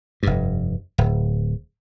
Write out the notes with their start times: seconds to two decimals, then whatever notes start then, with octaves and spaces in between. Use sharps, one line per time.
0.23 F1 G2
0.98 D1